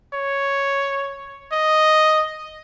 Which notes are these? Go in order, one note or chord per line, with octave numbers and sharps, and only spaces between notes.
C#5
D#5